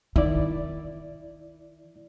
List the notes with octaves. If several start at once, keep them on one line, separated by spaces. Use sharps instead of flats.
D#3 E4 D5